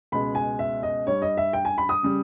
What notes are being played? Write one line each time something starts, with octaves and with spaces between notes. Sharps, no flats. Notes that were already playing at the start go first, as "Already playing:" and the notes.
C#2 B2 G#3 B5
G#5
E5
D#5
G2 G3 C#5
D#5
E5
G5
G#5
B5
D#6
C#3 G3